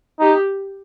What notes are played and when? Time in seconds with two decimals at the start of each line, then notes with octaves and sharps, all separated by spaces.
0.19 D#4 G4